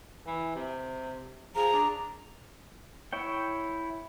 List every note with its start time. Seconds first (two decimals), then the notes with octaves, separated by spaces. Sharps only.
0.26 E3
0.56 C3
1.55 F3 G#4 A#5
1.73 D4
3.13 E4 C#5 G5